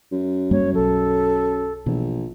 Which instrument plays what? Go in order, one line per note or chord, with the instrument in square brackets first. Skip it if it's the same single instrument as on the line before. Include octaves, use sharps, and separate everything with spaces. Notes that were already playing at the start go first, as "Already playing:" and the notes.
[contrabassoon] F#2
[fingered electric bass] G2 G3 A#3 [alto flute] C#5
[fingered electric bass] B1 F#3 [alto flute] A4
[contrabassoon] A#1 [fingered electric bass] B2 E3